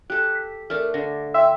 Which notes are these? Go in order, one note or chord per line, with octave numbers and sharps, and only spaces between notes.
G4 A4 F#6
B6
A3 D4 A4 A#4 F6
D3 D4 A#6
E5 G5 C6 E6